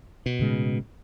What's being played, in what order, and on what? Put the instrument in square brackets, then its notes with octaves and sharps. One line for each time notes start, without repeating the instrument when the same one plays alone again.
[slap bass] B2
[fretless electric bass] A2 C#3 G#3